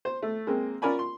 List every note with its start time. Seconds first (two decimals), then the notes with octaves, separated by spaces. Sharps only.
0.05 C5
0.22 A3
0.47 G#3 A#3 C4
0.82 C#4 F4 A#4 D5 G#5 B5
0.99 C6